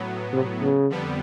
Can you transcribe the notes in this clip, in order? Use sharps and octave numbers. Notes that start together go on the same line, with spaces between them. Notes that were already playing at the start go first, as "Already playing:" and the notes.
Already playing: A2 F#3 B3
C3
C#3
F2 D3 G3 B3